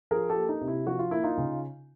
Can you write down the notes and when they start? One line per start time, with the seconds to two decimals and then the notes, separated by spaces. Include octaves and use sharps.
0.11 F3 G#4 A#4
0.30 G4 A4
0.36 A#3
0.49 D#4
0.61 C3
0.68 E4
0.87 F3 F#4
0.99 F4
1.11 A#3 E4
1.24 D#4 F4
1.38 C#3